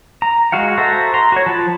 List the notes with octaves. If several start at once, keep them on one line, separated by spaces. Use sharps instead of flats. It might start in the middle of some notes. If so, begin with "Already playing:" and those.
A#5
G#3 F#4 F5 F#5
F#4 A4 C5 E5 A#5
A#5 C6
F#4 C#5
F3 A5 B5